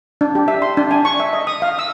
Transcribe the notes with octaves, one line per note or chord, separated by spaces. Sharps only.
D4
G4
E5
C6
D4
G#5
C#6
E5
D#5
D#6
F5
E6